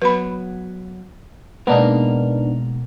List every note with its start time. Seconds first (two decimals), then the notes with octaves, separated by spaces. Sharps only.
0.02 F#3 B3 B4 B5
1.67 G#2 B2 A#3 B3 D4 D#4 A#4 A#5